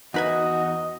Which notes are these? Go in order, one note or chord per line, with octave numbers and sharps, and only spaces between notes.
E2 D#4 F#4 B4 D#5 G#5